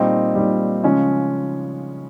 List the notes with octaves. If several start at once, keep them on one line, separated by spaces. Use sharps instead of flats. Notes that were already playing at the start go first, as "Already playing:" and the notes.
Already playing: A#2 G3 C4 D#4
A#2 G3
C#3 F3 G#3 C#4